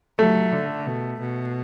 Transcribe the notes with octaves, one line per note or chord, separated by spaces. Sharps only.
F#3 A3
D3
B2
B2